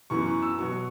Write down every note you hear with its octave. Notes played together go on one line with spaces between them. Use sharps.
F#2 E3 B3 C#6
C#6
E6
B2 F#3 B3 C#6